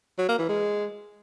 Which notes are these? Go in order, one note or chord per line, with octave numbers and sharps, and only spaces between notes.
F#3
A#3
E3
G#3